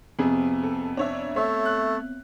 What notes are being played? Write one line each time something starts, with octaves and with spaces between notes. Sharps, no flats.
F2 C3 B3 C4 G#4
A4
D4 C#5 E5
A3 C#5 E5
F#6